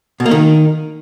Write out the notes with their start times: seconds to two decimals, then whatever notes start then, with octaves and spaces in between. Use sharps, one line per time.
0.20 B2
0.26 A#3
0.31 D#3